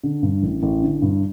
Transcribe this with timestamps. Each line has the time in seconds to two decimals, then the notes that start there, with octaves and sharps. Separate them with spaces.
0.03 D3
0.23 G2
0.43 A1
0.63 A1
0.82 D3
1.02 G2